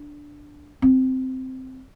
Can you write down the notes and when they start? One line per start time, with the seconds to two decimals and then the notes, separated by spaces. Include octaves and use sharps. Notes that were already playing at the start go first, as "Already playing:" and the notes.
Already playing: D4
0.82 C4